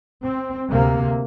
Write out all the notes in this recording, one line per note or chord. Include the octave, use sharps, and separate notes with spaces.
C4
D2 C3 A#3